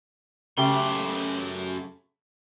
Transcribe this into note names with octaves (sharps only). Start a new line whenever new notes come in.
F#2 C#3 A3 G4 C6